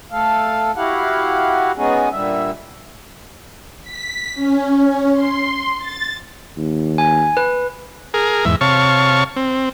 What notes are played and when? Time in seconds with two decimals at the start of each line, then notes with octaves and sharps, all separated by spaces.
0.12 A3 A4 F5
0.76 E4 F#4 G4 F5 F#5
1.77 G#3 B3 C#4 D#4 F#4 G#4
2.12 A#2 D3 G3 E5
3.83 B6
4.35 C#4
5.13 C6
5.78 A6
6.57 D#2
6.98 G#5
7.37 B4
8.14 G#4 A#4
8.45 E2 G#2 E5
8.61 C3 C#5 F5 A5 C#6
9.36 C4